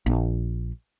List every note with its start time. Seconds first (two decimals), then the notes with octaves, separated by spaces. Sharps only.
0.06 A#1